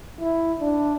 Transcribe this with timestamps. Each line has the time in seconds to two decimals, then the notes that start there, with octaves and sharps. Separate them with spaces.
0.21 E4
0.60 D4